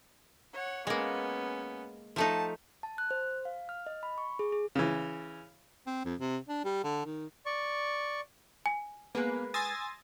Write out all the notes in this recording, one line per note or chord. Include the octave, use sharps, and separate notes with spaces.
C#5 F#5
G#3 A#3 B3 C#4
F3 A3 D#4 A5
A5
F#6
C5
F5
F6
D#5
B5
C#6
G#4
G#4
C#3 E3
C4
F2
C3
D4
G3
D3
D#3
D5 C#6
G#5
G#3 A#3 B3 G#4 B4
G#5 C6 D#6 E6 A6 A#6